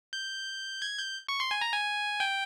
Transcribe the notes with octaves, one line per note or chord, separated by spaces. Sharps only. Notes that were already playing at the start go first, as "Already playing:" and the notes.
G6
G#6
G6
C#6
C6
G#5
A#5
G#5
G5